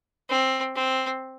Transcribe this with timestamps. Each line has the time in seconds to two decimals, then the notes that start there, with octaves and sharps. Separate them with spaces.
0.29 C4
0.75 C4